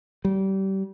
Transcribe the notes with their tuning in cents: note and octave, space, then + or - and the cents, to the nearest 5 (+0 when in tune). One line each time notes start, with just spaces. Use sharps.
G3 -30